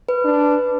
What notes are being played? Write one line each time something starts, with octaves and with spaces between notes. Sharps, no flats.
B4
D4